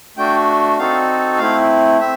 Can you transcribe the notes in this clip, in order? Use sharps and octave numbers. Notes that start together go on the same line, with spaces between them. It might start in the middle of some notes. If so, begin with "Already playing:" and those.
A3 D4 F#4 G5
C4 D#4 F#4 A4 F5
A3 C4 E4 F5
C4 E5